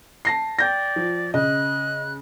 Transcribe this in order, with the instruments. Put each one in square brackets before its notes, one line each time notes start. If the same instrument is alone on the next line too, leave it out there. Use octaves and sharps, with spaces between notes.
[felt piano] A5 A#6 C7
[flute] D5 [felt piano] G5 G6 A#6
[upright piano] F3
[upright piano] C#3 [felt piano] D#5 [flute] F#6